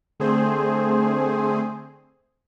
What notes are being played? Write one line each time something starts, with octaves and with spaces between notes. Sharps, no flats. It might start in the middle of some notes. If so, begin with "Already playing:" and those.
D3 A3 C4 G#4 C5